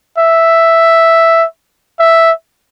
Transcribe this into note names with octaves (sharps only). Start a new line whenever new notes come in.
E5
E5